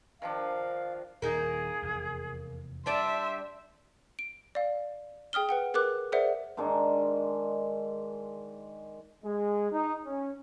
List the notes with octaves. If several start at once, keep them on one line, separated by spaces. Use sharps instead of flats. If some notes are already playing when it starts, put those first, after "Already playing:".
D#3 F3 D4 F5
D#1 A#3 D#4 G#4
F1 E2
G3 D4 D5 E5 A5 C6
D7
D5 F5
G#4 G5 D#6 F6 G7
B4 F#5 G5
G#4 A#4 B4 D6 F#6
G#4 A#4 C5 D5 E5 F#5
G#2 D#3 G#3 D4
G#3
D#4
C#4